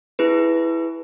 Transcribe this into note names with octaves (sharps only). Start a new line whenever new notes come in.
E4 G#4 B4